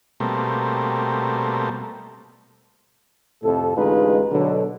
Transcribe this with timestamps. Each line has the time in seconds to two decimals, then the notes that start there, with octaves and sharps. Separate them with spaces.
0.20 B2 G3 A3 A#3 C4
3.43 F2 A2 C3 A4
3.77 A1 D2 G#3 D#4 F4 B4
4.31 B2 D3 F#3